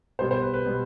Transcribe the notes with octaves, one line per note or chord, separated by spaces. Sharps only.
B2 G3 B3 C5
C5
B4
B4
B2 G3 B3